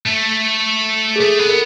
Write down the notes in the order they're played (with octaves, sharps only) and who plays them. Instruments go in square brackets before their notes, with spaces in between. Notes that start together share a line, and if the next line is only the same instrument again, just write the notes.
[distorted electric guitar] A3
[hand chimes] G#4
[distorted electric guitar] A3 [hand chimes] A4
[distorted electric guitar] B3
[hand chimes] A#4